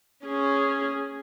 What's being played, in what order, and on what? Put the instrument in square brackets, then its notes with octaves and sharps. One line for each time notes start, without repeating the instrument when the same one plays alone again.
[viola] C#4 G#4